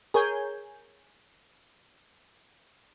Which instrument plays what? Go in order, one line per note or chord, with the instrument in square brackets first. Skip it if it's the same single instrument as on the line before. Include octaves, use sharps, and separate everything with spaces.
[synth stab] G#4 A#4 C#5 G#5 G6